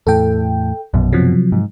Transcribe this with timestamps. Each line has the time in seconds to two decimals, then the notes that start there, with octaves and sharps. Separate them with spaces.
0.07 E2 A2 A4 G5
0.94 A#1 F#2 B2
1.13 C3 F3 F#3
1.52 G#2